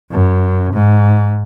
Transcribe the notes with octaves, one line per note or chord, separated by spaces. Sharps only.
F#2
G#2